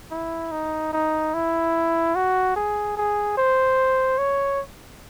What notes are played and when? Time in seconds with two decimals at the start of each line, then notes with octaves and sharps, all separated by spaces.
0.11 E4
0.51 D#4
0.93 D#4
1.34 E4
2.15 F#4
2.56 G#4
2.97 G#4
3.37 C5
4.18 C#5